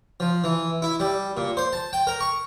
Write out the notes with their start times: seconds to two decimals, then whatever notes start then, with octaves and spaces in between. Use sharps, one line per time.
0.20 F3
0.44 E3
0.82 E4
1.00 G3
1.37 A#2
1.57 C5
1.73 A5
1.93 G5
2.07 A#4
2.21 C#6